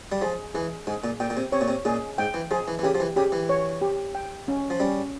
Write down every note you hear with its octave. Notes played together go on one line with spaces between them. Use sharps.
G3
F3 G#4
E3 G#4
G#2 G#4
A#2
A#2 G5
A#2
C3
C3 C#5
A#2
C3
A#2 G#4
G#2 G5
E3
F3 G#4
E3
E3
C#3 G4
F3
E3
C#3 G4
E3
C#5
G4
G5
C#4
F3
G3 C#4